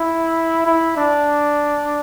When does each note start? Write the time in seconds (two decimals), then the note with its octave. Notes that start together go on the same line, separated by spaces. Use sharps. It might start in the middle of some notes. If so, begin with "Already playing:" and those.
Already playing: E4
0.67 E4
0.97 D4